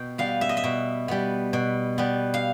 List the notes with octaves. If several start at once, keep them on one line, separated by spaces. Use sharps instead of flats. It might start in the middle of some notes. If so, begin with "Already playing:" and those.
Already playing: B2 G5
G3 B3 F5
E5
D#5
E5
B2
G3 B3
B2
G3 B3
F5